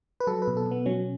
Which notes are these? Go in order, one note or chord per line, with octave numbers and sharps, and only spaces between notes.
B4
F#3 A4
B4
B2
A4
B2
B3
F#3 C#4